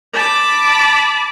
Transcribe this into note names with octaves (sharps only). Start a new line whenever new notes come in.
A5 B5 D6